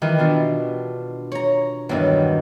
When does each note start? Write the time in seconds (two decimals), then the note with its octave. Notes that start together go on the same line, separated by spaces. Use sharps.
0.02 D#3 E3 F4 G4
0.18 B2 D4 F4
1.32 C#5 A#5
1.89 E2 G2 D#3 F#3